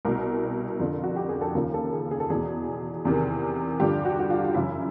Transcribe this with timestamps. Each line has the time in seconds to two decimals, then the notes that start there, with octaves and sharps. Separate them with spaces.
0.05 C2 B2 A#4
0.80 F2 D3 F3
1.03 F#4
1.16 G4
1.29 G#4
1.41 A4
1.55 D#2 C#3 F3 A#4
1.74 A4
1.93 G#4
2.11 G#4
2.20 A4
2.30 E2 B2 G#4
3.05 E2 C3 D#3
3.80 G2 D3 F3 G4
4.05 F#4
4.19 F#4
4.30 F4
4.54 F#2 C#3 E3 E4